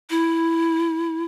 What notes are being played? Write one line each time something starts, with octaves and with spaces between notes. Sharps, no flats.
E4